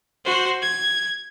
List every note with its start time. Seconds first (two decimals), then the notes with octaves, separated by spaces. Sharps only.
0.25 F#4 C5
0.62 G#6